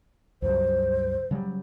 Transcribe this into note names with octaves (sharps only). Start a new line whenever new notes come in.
C#2 G2 F#3 C5
C#3 F#3 G3